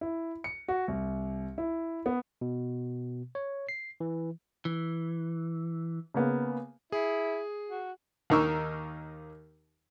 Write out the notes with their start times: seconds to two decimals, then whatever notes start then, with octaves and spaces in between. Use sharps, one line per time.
0.01 E4
0.44 C#7
0.68 F#4
0.88 C2
1.58 E4
2.06 B3
2.41 B2
3.35 C#5
3.69 C7
4.00 E3
4.65 E3
6.14 C#3 A#3 B3
6.92 E4 G#4
7.69 F#4
8.30 D#2 A#3 D#4 A#4 C#6 E6